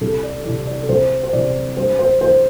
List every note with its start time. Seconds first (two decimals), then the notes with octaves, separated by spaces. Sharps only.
0.01 C2 A4
0.23 D5
0.44 C3 E3 D5
0.67 D5
0.83 A4
0.89 C2 C5
1.23 C5
1.32 C3 E3 D5
1.77 G2 C5
1.99 C5
2.21 E3 C5